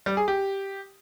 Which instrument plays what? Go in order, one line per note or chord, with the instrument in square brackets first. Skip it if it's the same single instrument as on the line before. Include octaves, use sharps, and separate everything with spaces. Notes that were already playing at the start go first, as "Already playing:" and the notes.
[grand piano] G3
G#4
G4